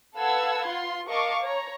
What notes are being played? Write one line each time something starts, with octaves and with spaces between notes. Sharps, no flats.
A4 B4 F5 F#5 E6 G#6
F4 C6
A#4 D#5 F5 A5 C#6 D6
C#5 A#5